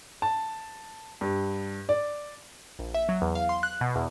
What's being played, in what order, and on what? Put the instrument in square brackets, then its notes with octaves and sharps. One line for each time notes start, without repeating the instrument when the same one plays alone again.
[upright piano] A5
G2
D5
[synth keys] A#1
E5
F#3
E2
F5
C6
F#6
B2
E2